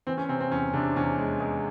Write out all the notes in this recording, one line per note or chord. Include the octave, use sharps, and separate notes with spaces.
E3 C4
C#4
C3 C4
C4
E2 C#4
C3 D4
E2 C#4
G#3
G#3